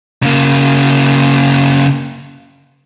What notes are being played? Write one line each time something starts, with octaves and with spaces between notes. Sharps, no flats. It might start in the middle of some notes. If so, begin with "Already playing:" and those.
C#3 A#3